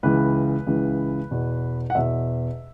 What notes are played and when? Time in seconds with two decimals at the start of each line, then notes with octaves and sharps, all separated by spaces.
0.03 C#2 C#3 E3 B4
0.66 C#2 C#3 E3
1.31 E2 B2
1.90 F#5
1.95 E2 B2 E5